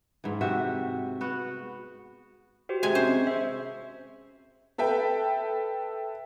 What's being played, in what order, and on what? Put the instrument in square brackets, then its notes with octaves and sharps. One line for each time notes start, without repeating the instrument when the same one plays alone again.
[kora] G#2 E3
C3 F#4 E5
B3 F#4
[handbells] F#4 G4 C5
[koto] C3 G#3 G#5
[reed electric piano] C4 C#4 [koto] C5 [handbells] C#6
[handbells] C5 E5
[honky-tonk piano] A4 B4 E5 G5